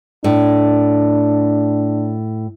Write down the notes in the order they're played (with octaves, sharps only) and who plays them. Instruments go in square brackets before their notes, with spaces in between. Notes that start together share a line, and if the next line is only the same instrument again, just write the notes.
[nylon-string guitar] A2 [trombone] D4